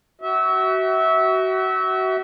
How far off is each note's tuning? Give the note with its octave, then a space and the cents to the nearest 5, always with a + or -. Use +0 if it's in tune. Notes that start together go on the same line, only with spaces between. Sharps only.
F#4 +25 E5 -20